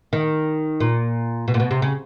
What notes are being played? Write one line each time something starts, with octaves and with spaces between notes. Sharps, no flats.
D#3
A#2
B2
A#2
B2
C3
C#3